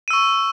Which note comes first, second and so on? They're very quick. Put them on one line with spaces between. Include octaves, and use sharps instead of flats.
D#7 E6 C#6